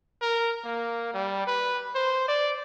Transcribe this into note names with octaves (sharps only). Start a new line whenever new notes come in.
A#4
A#3
G3
B4
C5
D5